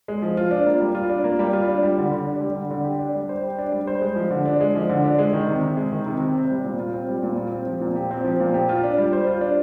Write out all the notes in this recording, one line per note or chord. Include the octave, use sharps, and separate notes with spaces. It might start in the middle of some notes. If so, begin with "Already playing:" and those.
G#3
F3
F4
D4
A#3
G3
F4
D4
A#3
G3
F4
D4
G3
D3
D3
D4
G3
D3
D3
G4
D4
G3
C5
G4
D4
G3
C5
G#3
F3
D3
D4
G#3
F3
D3
D4
G#3
D#3
C3
C3
G#3
D#3
C3
C3
C4
G3
A#2
F4
C4
G3
A#2
F4
C4
F3
A#2
G4
C4
F3
A#2
G4
F4
D4
G3
C5
F4
D4